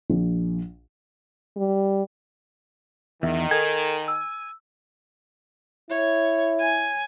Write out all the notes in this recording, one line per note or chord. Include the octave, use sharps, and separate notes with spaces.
A#1
G3
E2 D#3 E5
A4 A#4 G#5
E6
E4 C#5
G#5